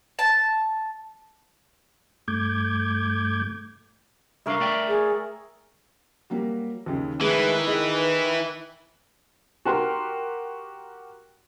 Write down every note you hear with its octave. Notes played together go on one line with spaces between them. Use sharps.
A5
G2 A3 D6 G6 G#6
C2 D4 A#4 C#5 E5 F5
A3 D5 G5
G#4
F#3 G3 A#3
D#2 C#3
D#3 E3 G#3 A3 G#4 B4
G#4 D#5
F#4 G4 A#4 C6